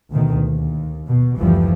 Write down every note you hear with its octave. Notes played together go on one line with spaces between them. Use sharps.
D2 B2 D#3
D#2
B2
F#1 D2 E3 F3 G3